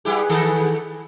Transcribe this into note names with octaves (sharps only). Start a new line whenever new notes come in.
G3 E4 G4 G#4 B4 F#5
D#3 A4